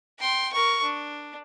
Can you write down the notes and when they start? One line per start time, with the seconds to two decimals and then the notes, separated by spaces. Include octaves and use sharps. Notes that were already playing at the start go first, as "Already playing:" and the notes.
0.19 G5 C6
0.53 A#4 C#6
0.83 D4